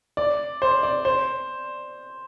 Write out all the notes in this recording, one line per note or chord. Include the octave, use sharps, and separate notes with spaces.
D5
C5
D5
C5